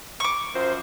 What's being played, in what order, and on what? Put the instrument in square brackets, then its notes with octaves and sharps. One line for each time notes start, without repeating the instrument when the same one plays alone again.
[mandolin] C#6 D6
[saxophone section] F#2 F3 C5